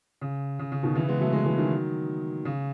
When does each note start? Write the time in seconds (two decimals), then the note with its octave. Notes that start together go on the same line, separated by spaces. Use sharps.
0.21 C#3
0.59 C#3
0.72 C#3
0.83 B2 D#3
0.95 C#3 E3
1.09 G#3 B3
1.20 F#3 A3
1.33 E3 G#3
1.45 E3 G#3
1.58 D#3 F#3
2.45 C#3